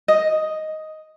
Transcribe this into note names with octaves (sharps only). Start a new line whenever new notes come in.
D#5